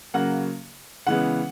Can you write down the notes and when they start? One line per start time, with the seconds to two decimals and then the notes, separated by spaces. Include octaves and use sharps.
0.14 C#3 F#3 A#3 F#5
1.06 C#3 E3 G#3 B3 F#5